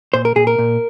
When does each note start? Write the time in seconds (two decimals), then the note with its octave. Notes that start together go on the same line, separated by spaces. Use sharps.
0.14 A#2 C5
0.25 A#4
0.36 A#2 G#4
0.47 A#4
0.58 A#2